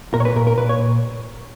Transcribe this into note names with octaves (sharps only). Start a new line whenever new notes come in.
A#2 A#4
C#5
B4
A#2 A#4
A#4
A#2 B4
C#5